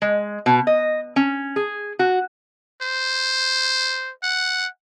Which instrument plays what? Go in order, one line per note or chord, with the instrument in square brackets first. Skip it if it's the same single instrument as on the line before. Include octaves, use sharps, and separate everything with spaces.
[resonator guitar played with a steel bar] G#3
B2
D#5
C#4
G#4
F#4
[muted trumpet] C5
F#5